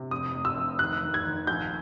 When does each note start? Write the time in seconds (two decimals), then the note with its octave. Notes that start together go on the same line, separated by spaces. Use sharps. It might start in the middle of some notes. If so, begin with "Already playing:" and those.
Already playing: C3
0.11 F1 D#6
0.34 F1
0.45 E6
0.57 F1
0.79 D#3 F#6
1.03 D#3
1.14 G#6
1.25 D#3
1.47 A#1 G6